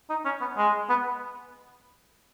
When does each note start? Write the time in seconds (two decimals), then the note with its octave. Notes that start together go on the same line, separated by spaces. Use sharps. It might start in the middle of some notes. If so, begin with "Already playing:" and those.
0.10 D#4
0.25 C#4
0.41 B3
0.57 G#3
0.89 B3